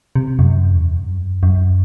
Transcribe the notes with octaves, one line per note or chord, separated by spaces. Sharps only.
C3
F#2
E2
G2
F#2
F#2